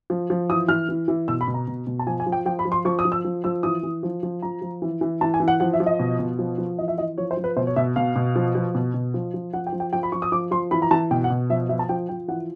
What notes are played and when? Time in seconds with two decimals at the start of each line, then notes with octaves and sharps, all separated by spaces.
0.10 F3
0.30 F3
0.49 E3 D#6
0.68 E3 F6
0.89 E3
1.08 E3
1.28 B2 E6
1.41 B5
1.48 B2
1.54 A#5
1.67 B2
1.87 B2
1.99 A5
2.07 F3 G#5
2.20 G#5
2.26 F3
2.32 G5
2.46 F3 G5
2.59 B5
2.65 F3
2.72 C6
2.85 F3 C#6
2.99 D#6
3.05 F3
3.12 E6
3.25 F3
3.44 F3 E6
3.63 E3 D#6
3.83 E3
4.03 F3
4.23 F3
4.42 F3 A#5
4.62 F3
4.82 E3
5.01 E3
5.21 E3 A5
5.34 G#5
5.40 E3
5.48 F#5
5.60 F3 F#5
5.73 E5
5.80 F3
5.86 D#5
5.99 B2
6.19 B2
6.39 F3
6.58 F3
6.78 E3 D#5
6.88 E5
6.98 E3 D#5
7.18 F3 C#5
7.31 C5
7.37 F3
7.44 B4
7.57 B2 C5
7.67 C#5
7.76 B2 E5
7.96 B2 F5
8.16 B2
8.36 F3
8.55 F3
8.75 B2
8.94 B2
9.14 F3
9.34 F3
9.53 F3 F#5
9.67 G5
9.72 F3
9.80 G5
9.93 F3 G5
10.03 B5
10.12 F3 C#6
10.22 D#6
10.32 F3 D6
10.51 F3 C6
10.71 E3 B5
10.82 A#5
10.91 E3 A5
11.11 B2 G5
11.24 F#5
11.30 B2
11.50 F3 E5
11.69 F3 E5
11.79 A5
11.89 F3 G5
12.09 F3 G5
12.28 E3 F#5